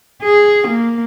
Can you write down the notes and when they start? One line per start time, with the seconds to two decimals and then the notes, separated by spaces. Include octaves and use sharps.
0.22 G#4
0.67 A#3